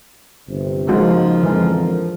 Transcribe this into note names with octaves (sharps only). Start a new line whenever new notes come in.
G1 C3
C#3 F3 G#3 A#3 D#4 F#4
F2 D3 E3 G#3 A#4